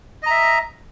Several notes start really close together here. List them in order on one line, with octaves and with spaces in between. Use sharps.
D#5 A#5 E5